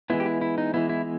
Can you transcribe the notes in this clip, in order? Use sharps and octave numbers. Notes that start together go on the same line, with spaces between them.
E3 G#3 B3 E4
G4
E4
E4
D#4
E3 G#3 B3 E4
E4